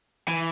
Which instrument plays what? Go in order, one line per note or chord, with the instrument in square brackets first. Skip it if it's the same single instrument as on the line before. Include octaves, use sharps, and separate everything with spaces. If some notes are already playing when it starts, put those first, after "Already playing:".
[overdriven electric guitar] E3